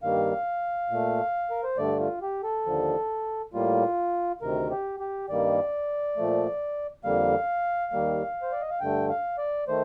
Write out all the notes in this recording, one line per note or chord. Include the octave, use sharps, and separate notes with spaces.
G2 D#3 G3 A#3 F5
A#2 A3
A#4
C5
G2 D3 A3 D5
F4
G4
A4
D#2 D3 F3
A2 G3 A#3 F4
D2 C3 D#3 A#4
G4
G4
G2 D#3 G3 A#3 D5
A#2 F3 A3
F2 D3 G3 A#3 F5
D#2 D#3 G3 A#3
C5
D5
D#5
F5
G2 D3 A3 G5
F5
D5
D#3 A3 C5